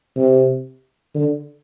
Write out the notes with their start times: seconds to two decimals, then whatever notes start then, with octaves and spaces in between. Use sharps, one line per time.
0.17 C3
1.15 D3